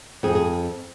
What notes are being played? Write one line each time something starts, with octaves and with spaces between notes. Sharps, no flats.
F2 G#4
G#4